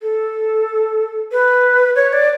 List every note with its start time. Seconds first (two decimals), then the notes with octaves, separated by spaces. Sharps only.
0.02 A4
1.32 B4
1.96 C#5
2.13 D5